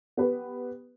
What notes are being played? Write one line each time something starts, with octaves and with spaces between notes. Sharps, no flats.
B3 G4 B4